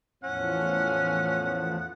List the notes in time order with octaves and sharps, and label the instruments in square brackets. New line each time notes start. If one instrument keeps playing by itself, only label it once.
[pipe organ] E2 A2 F3 [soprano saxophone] C#4 [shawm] F#5